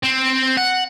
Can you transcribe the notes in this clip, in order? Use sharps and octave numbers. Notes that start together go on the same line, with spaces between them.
C4
F#5